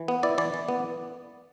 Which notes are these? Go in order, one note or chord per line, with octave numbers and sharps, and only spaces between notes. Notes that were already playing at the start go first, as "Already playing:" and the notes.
Already playing: E3
B3
E4 D5
E3 D5
E3
B3